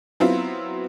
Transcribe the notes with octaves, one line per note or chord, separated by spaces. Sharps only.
F#3 B3 C4 E4 F4